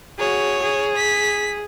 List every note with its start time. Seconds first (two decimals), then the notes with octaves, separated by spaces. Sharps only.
0.19 F#4 G#4 C#5
0.62 G#4
0.97 B6